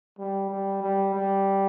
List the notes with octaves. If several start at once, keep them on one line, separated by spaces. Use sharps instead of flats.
G3
G3
G3
G3